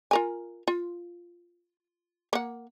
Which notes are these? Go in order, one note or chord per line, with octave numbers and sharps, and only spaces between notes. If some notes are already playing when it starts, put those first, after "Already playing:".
F4 A#4 G#5
F4
A#3 F#5